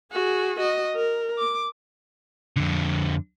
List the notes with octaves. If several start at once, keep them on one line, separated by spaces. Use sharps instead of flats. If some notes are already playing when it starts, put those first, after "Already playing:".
F#4 G#4
F#4 D#5
A#4
D6
F2 D3